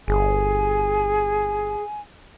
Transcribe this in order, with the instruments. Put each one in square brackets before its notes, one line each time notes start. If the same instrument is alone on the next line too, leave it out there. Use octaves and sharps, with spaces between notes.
[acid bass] G1 [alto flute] G#4 [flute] G#5